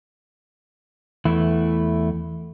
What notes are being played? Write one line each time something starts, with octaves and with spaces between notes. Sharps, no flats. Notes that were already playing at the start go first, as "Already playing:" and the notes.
E2 E3 A3 E4